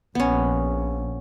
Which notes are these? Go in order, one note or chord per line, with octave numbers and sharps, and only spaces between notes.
A#1 B3 C#4